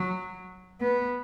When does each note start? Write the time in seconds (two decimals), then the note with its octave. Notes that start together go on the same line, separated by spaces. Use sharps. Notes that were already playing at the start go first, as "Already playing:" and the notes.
Already playing: F#3
0.81 B3